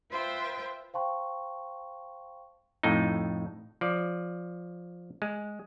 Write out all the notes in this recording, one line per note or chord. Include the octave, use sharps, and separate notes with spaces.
F4 B4 C5 E5 G5 C6
C5 F5 G5 A5 C6 C#6
F2 A2 D#4
F3 D5
G#3